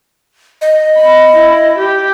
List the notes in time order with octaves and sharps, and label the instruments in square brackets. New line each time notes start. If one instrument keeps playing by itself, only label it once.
[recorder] D#5
[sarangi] B5
E4
G4